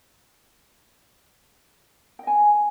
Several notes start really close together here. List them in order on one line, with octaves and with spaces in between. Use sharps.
G5 D#5 G#5